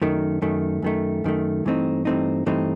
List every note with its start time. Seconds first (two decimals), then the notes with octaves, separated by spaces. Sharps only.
0.02 F#2 D#3 A3
0.42 F#2 D#3 A3
0.82 F#2 D#3 A3
1.24 F#2 D#3 A3
1.65 G2 E3 A3 C4 D#4
2.05 G2 E3 A3 C4 D#4
2.46 G2 E3 A3 C4 D#4